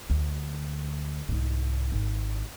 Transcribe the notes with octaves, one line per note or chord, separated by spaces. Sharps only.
D2
C2 G#2
G#1